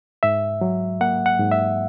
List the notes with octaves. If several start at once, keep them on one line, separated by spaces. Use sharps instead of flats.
G#2 E5
F#3
A#3 F#5
F#5
G#2
E5